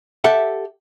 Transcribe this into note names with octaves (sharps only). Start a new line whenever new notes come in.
G4 A4 E5 F#5